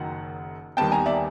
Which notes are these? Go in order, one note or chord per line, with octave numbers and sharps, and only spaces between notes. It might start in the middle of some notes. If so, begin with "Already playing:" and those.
Already playing: F#1 F#2 D#3 F#3 F#5
D#2 D#3 G3 B3 G5 A5
G#5 A#5
D5 E5